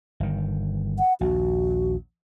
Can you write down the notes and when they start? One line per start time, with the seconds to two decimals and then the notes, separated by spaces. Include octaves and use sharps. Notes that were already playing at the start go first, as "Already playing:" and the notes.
0.20 G1 D#3
0.99 F#5
1.21 A#1 D#2 F#4